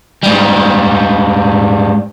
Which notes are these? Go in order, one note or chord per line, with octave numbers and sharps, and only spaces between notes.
G#2 G3